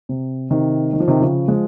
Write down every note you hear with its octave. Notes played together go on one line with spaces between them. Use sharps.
C3
C3 D#3
D#3
F3
C3 D#3
C#3 F3
F3 G#3